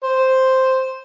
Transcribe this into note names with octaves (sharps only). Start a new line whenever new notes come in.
C5